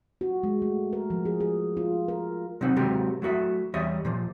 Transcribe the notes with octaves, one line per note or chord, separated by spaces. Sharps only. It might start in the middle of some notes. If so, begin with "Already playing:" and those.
F#4
G#3
A3
A#4
F3
G#4
G#4
F4
A#4
C3 F#3 C4 D#4 F#5
C3 F#3 G#3 F#4 G4 A#4
F#3 A3 F#4 E5
E2 G3 C#5 D#5 E5
A#2 F3 A#3